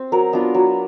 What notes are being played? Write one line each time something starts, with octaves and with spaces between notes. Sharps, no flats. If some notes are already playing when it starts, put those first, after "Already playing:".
Already playing: C4
F#3 A#4
B3 D4 F4
F#3